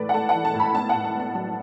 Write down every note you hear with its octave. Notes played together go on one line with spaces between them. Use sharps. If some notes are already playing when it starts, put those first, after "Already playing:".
Already playing: A2 E3 A3 B4 D5
F#5
A3 A5
F#5
E3
A5
A2
B5
B3 A5
F#5
A2
A5
B3 A5
F#3 A5